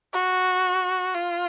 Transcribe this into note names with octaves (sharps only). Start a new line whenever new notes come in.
F#4
F4